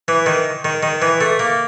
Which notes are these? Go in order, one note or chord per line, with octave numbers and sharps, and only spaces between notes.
E3
D#3
D#3
D#3
E3
A3
A#3